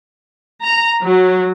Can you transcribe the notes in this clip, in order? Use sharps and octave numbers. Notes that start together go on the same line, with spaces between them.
A#5
F#3